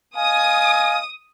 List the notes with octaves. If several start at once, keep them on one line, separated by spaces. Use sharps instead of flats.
D#5 F5 G#5 D#6